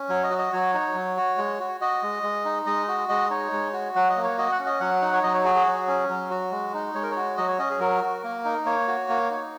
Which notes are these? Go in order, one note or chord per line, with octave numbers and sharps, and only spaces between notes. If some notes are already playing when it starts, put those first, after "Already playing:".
Already playing: C#4
F#3 C#5
D#5
F#4
D#5
F#3 C#5
D#4
F#3
F#4
G#3
F#4
F#4 D#5
G#3
G#3
D#4
G#3 D#5
F#4
G#3 D#5
D#4 C#5
G#3
F#4
F#3 F#5
D#5
A#3
C#5
F#4 D#5
F#5
C#4
D#5
F#3 F#5
D#4
C#5
F#3 D#5
C#5
F#4 G#4
G#4
F#3
C#4
F#3
F#4
G#3
D#4
G#3 C#5
A#4
F#4 C#5
F#3 D#5
C#5
C#4 D#5
G#4
F#3 A#4
F#4
A#3
D#4
A#3 C#5
F#4
A#3
D#4